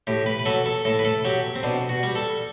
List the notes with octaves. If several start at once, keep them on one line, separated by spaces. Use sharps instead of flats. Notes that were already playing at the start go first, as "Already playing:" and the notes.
A2 G4
B4
B4
F#3 A4
A4
A2 A4
B4
A4
F#3 G4
C4
B2 D4
F#4
G3
A4